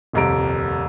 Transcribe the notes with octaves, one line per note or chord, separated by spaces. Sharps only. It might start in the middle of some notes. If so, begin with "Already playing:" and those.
D#1 C2 F2 G3 A#5 D7